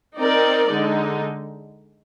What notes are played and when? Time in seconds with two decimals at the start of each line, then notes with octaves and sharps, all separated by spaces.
0.18 C4 D#4 A#4 D5
0.70 D3 G#3 D#4